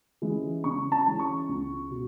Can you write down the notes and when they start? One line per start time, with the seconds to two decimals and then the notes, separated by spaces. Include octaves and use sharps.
0.22 E3 G#3 C#4 E4
0.64 C#3 C#6
0.92 A5
1.06 E3 G#3 C#4 E4
1.19 C#6
1.49 C#2
1.90 B2